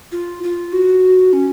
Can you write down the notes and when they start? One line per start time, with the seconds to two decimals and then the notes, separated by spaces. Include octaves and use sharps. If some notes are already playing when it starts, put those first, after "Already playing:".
0.12 F4
0.43 F4
0.73 F#4
1.33 C#4